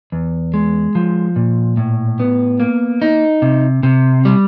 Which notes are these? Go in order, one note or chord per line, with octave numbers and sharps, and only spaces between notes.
E2
G#3
F3
A#2
A2
B3
A#3
D#4
C3
C3
G3